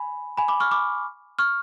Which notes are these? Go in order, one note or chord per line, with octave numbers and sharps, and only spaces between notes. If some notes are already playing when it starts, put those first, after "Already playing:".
Already playing: G#5 B5
G#5 B5
B5 D6
C#6 F6
B5 D6
C#6 F6